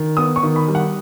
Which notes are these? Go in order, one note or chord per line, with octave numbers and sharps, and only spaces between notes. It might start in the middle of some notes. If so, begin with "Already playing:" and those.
Already playing: D#3
B3 D#6
C#6
D#3
B5
G3
F#5